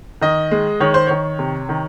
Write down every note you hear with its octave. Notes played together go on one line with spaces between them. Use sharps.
D#3 D#5
G#3
D#3 C#5
C5
D#3 C#5
C3
D#3